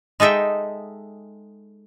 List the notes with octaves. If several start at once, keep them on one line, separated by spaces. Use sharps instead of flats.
G#3 D#4 A4 E5 G5